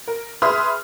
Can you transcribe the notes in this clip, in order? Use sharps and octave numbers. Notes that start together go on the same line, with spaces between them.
A#4
G#4 B4 E5 C6 D#6 F6